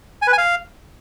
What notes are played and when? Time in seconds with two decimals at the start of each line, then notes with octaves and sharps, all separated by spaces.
0.22 G#5
0.27 B4
0.33 G#5
0.38 F5